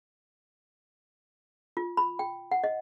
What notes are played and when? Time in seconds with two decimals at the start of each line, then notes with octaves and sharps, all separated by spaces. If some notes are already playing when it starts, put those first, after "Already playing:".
1.77 F4
1.97 B5
2.19 G5
2.52 F#5
2.64 D#5